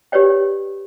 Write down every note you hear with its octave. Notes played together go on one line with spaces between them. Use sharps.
G4 B4 C#5 D5 G5